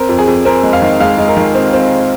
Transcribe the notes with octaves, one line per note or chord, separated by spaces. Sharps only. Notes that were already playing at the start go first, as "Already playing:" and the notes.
Already playing: C4 A#4
F2
G#4
F2
C4 A#4
G#3
F5
D#3
G#3 F5
G#3
A#4
D#3
C4
C4